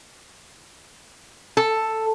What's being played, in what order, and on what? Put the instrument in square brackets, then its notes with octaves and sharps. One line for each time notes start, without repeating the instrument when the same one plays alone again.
[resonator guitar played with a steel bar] A4